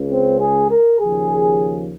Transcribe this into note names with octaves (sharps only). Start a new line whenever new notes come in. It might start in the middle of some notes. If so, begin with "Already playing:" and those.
Already playing: C#2 C#3 G#3
C4
G#4
A#4
D#2 C#3 F3 G#4